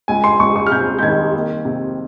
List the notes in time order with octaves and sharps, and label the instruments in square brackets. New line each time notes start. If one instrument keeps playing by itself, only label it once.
[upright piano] C#2 G#5
C6
C#2 C#6
C#6
F6
C3 G6
G6
D#3 G#6
A#3
C3